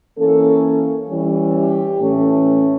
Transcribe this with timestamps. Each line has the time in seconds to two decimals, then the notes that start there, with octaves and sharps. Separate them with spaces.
0.18 E3 A#3 C#4 A4
1.08 E3 G3 C#4
1.54 G4
1.98 A2 E3 A3 C#4